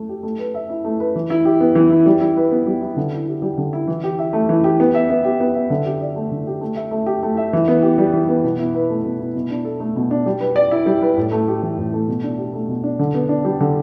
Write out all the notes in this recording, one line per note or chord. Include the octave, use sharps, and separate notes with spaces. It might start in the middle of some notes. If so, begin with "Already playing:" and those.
Already playing: A3
G4
A3
B4
E5
E4
A3
B4
E3
E4
G4
B3
E3
E4
G3
E4
B4
B3
G3
E4
D3
E4
G4
G3
D3
E4
E3
G4
E5
A3
E3
G4
B3
E5
B3
G4
B3
E5
D3
G4
D5
A3
D3
G4
A3
E5
A3
G4
A3
E5
E3
B3
G4
G3
E3
B3
B2
E4
B4
A3
B2
E4
B2
D4
A4
A3
B2
D4
G3
B4
D5
E4
G3
B4
A2
A3
G4
E3
A2
A3
B2
D4
G4
A3
B2
D4
D3
B3
D4
G3
D3